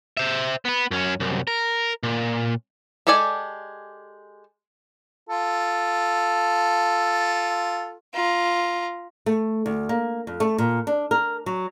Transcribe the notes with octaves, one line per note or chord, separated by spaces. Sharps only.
C5 E5
B3 B4
F#2 C#4
C2 F#2
A#4
A#2
G#3 G4 A4 D5 G#5
F4 A4
F4 A#5
A3
D2
A#3
F2
A3
A#2
D4
A#4
F#3